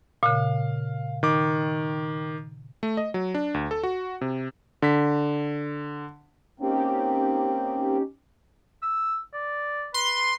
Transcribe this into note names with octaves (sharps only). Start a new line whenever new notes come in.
A#2 C#3 F5
D#3 D6
A3
D#5
F#3
D4
D2
A4
F#4
C3
D3 B6
A#3 C4 C#4 D#4 G4
E6
D5
B4 C6